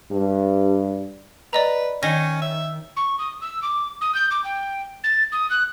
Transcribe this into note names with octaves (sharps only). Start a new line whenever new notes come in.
G2
B4 D5 D#5 A#5
D#3 C#4 C#5 A#6
E5
C#6
D#6
E6
D6
D#6
G6
D6
G5
A6
D#6
F#6